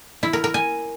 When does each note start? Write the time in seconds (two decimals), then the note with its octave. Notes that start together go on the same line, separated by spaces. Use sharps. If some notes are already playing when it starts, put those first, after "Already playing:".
0.23 E4
0.33 A#4
0.44 A#4
0.54 G#5